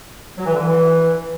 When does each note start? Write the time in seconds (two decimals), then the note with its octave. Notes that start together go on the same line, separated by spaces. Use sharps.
0.37 F#3
0.45 E3
0.53 D3
0.61 E3